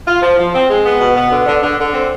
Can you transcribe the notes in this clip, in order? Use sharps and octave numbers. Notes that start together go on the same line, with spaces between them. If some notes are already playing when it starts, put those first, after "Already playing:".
F4
F3
F3
C4
G#3
B3
B2
B3
D3
D3
D3
D3
C4